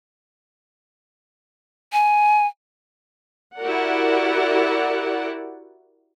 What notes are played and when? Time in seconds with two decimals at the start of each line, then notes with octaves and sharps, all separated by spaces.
1.93 G#5
3.59 E4 F#4 G4 A#4 D5 F#5